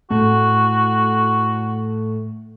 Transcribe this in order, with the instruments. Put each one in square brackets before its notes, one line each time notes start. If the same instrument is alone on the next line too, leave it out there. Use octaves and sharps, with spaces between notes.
[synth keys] A2 A3 [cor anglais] F#4